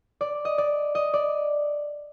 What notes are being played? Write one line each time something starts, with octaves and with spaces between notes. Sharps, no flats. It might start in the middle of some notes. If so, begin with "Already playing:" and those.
D5
D#5
D5
D#5
D5